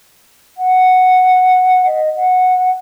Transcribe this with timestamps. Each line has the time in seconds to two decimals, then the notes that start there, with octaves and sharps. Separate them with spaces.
0.57 F#5
1.85 D#5
2.16 F#5